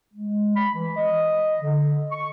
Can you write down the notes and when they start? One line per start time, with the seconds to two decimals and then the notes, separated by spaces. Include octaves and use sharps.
0.14 G#3
0.56 B5
0.75 E3
0.96 D#5
1.61 D3
2.12 C#6